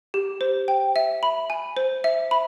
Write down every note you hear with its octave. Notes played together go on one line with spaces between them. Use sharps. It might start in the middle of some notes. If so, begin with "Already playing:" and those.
G4
C5
G5
E5
B5
G#5
C5
E5
B5